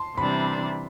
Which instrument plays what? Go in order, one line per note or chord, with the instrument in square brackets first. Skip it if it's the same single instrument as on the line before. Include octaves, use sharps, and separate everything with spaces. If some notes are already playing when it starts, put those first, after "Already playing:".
Already playing: [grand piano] A5 C6
[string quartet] C3 E3 G3 D4 [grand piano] B5